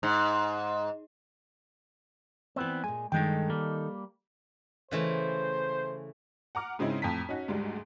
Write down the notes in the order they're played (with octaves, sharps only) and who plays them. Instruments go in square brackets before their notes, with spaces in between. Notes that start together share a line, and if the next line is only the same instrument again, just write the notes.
[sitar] G#2
[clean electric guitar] E3 B3 C4 [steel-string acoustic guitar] B4 D5
[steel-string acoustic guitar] A#2 G#3 [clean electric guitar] G#5
[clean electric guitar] G2 G#3 G5 [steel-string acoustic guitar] D#3 D#4 A4
[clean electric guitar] G3 A#3
[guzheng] C#3 E3 A3 [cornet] C5
[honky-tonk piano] F#5 A#5 D6 F6
G#2 C#3 C4 C#4 D#4 E4
F2 A2 A#5 B6
C#4 D#4 F#4
D2 G#2 G3 G#3